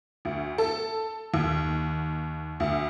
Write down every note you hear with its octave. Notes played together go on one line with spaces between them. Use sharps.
D2
A4
D#2
D2